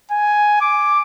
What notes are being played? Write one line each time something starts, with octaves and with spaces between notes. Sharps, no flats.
G#5
D6